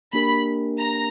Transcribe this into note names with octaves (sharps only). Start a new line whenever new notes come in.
A#3 D4 G4 A#4 B5
A#5